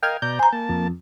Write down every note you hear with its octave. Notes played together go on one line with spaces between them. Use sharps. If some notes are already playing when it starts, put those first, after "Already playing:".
A#4 D#5 F5 G5 F6 G#6
B2 D5 A#5 G6
C5 G#5 A#5
A#3 A5
F2